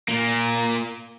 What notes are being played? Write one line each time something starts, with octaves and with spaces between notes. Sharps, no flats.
A#2 A#3